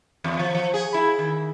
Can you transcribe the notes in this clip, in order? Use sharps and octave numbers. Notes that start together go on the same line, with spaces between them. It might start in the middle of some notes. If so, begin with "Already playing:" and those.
E2
F3
F3
G#4
E4
D#3